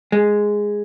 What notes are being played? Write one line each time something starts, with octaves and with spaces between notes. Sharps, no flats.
G#3